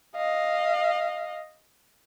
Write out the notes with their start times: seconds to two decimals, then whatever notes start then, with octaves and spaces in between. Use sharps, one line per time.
0.16 D#5 F5